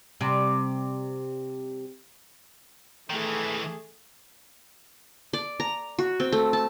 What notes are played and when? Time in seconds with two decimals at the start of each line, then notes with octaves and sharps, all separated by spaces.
0.21 C3 G3
3.10 D#3 E3 A3 G#4
5.33 D5
5.60 A#5
5.99 F#4
6.20 C4
6.32 A3
6.53 A5